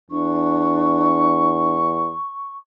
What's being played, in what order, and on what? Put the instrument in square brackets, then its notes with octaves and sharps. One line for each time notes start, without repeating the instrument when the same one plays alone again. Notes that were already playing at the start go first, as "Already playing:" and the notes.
[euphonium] E2 [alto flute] D4 [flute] C#6